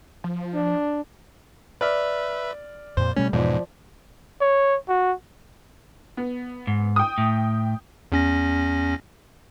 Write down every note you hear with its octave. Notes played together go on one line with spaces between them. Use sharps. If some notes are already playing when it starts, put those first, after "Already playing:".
F3
D4
B4 D5 E5 F6
F2 A#2 C5
B2 G3 A3 C#4
E2 G#2 B2 F3 D5
C#5
F#4
B3
G#2
G5 D#6
A2
E2 C#4 A#6